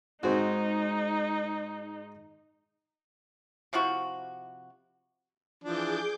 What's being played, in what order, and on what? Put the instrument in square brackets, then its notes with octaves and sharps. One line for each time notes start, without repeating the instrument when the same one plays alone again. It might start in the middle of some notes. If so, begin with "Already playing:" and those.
[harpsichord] G#2 [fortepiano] C4 F#4 [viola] D#4
[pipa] C3 F3 E4 F#4
[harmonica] E3 F3 D4 [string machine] G#4 D6 G6